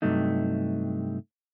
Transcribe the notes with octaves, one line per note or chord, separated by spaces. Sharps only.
G2 C3 F#3 A3 D#4